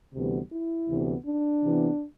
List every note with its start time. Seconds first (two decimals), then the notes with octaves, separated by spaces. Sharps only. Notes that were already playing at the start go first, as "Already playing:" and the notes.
0.13 D2 C3 E3 G3 B3
0.51 E4
0.88 D2 C3 E3 B3
1.25 D4
1.62 C3 E3 B3